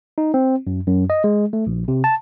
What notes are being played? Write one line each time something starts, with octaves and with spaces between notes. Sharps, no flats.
D#4
C4
F#2
F#2
D#5
G#3
A3
A#1
C3
A5